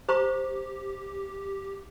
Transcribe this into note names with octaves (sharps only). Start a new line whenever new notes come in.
G4 C5 A#5 C#6